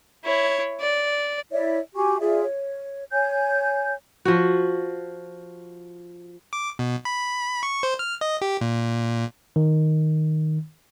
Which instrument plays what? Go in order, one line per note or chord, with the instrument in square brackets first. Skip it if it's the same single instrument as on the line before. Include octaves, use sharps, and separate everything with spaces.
[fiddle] E4 C#5
D5
[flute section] E4 C#5 D5 E5
F#4 G4 G#5 C#6
F4 G#4 D5 E5
C#5
C#5 G#5 G6
[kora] F3 F#4
[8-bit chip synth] D6
B2
B5
C#6
C5
F6
D#5
G4
A#2
[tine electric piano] D#3